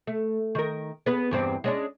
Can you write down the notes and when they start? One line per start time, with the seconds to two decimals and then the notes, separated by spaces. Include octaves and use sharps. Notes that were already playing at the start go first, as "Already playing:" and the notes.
0.07 A3
0.55 D#3 A#4
1.06 B3 G#4 B4
1.31 E2 G2 C4
1.64 G#3 C#4 D4